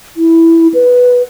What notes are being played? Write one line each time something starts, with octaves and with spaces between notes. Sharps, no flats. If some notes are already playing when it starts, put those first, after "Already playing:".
E4
B4